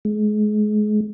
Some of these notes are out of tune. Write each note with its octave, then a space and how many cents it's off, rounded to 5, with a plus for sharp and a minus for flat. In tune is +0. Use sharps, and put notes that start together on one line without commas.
G#3 +30